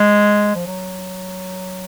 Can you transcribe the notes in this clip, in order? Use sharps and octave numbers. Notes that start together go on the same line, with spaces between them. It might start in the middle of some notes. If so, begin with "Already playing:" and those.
Already playing: G#3
F3
F#3